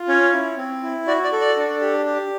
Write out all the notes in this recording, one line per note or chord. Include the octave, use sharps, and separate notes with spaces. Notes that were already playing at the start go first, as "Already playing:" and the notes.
Already playing: F4
C#4 C#5
E4
C4
E4
F#4 D5
D5
A4
D5
D4
G4
G4